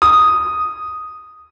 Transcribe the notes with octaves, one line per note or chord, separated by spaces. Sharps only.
D#6